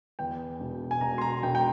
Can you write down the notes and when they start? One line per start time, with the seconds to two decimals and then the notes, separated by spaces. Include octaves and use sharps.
0.19 E2 G5
0.60 E1
0.91 G#5
1.01 E1 A#5
1.18 C6
1.21 A#5
1.43 E1 G5
1.55 G5